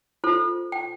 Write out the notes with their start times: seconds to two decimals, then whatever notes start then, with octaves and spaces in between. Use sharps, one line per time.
0.24 F4 A4 C5
0.72 G5